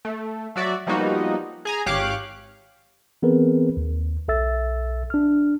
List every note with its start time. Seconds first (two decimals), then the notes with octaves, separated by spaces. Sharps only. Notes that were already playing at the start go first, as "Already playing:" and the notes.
0.05 A3
0.56 F#3 F#4 D5 E5
0.87 F3 G3 A#3 B3 D#4 F#4
1.65 G#4 G#5 A#5
1.86 G#1 G4 C#5 F5 D6 F#6
3.22 E3 B3 C4 G#4 A#4 B4
3.77 D#2
4.28 B1 A4 E5 E6 A6
5.10 D4 F6